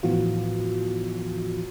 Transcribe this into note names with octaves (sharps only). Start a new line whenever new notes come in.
A2 E3 F3 B3 F4 F#4